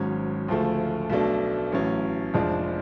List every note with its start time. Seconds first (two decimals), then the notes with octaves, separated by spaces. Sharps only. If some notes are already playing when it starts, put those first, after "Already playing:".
Already playing: G#1 G#2 F#3 C#4
0.48 D2 C#3 F3 A3
1.10 B1 B2 A3 D4
1.72 A1 A2 F#3 C#4
2.34 F1 F2 F3 G#3 D4